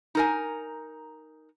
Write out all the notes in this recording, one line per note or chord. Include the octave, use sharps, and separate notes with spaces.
D#4 A#4 G#5